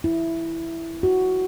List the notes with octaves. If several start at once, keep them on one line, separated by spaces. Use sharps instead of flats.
E4
F#4